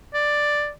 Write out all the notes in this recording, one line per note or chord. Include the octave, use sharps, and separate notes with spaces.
D5